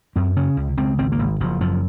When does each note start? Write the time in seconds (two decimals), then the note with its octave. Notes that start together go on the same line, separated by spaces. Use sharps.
0.16 F#2 C4
0.36 C#3 C#4
0.57 C#2
0.77 C#2 C4
0.98 G#1 C4
1.12 A#3
1.19 G#1
1.40 F#1 F3
1.60 F#2 F3